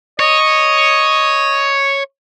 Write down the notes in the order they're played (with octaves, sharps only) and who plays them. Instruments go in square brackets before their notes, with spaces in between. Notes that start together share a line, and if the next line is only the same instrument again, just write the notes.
[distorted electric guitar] C#5 [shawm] D#5